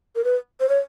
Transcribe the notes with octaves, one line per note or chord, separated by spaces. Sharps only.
A#4
B4
C5
C#5